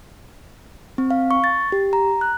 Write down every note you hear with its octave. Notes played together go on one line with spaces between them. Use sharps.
C4
F5
C#6
A6
G4
A#5
F#6